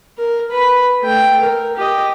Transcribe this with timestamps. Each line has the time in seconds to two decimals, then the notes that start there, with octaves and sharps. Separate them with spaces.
0.18 A#4
0.51 B4 B5
1.02 A3 G5
1.40 A#4
1.76 G4 D#5